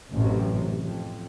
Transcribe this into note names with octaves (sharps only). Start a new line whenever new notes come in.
A1 F#2 A2 C3
F2